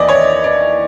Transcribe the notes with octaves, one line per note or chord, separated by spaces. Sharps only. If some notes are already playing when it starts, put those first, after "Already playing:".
Already playing: D#2 E3 D5 D#5
C#5
D5